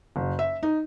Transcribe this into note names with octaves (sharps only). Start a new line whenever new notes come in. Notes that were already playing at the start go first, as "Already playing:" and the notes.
F#1
E5
D#4